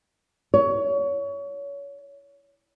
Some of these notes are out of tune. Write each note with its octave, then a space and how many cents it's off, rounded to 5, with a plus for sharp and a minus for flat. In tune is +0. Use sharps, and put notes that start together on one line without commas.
C#5 +25